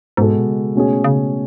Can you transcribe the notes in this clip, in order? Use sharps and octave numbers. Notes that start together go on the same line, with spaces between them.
G#2 B2 G#3 B3 F#4 A4
B2
C#3
B2 A3 C#4 G#4
C#3